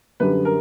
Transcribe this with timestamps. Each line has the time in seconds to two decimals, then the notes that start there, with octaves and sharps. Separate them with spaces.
0.20 F#2 D3 G3 B4
0.45 A#4